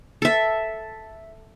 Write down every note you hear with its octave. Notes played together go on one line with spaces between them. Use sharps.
A4 E5